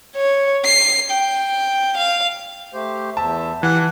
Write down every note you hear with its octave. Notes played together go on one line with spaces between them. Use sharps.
C#5
C7
G5
F5
A3 G4 C5
E2 E5 A5
E3 G4 F#5